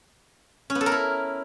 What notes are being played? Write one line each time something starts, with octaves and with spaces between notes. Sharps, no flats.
C#4
B3
A4
A#4
E4